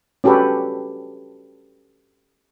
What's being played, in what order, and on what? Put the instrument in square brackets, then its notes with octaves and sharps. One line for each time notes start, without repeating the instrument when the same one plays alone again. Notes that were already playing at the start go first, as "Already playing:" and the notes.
[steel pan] C#4 F#4 G4 A4 B4